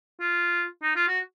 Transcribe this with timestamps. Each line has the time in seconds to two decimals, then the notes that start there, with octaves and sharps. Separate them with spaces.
0.20 F4
0.83 D#4
0.96 F4
1.08 F#4